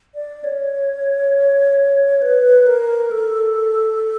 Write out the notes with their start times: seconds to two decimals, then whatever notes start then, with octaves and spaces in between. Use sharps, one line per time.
0.15 D5
0.44 C#5
2.22 B4
2.66 A#4
3.11 A4